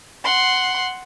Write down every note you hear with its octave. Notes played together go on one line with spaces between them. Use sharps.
F#5 C6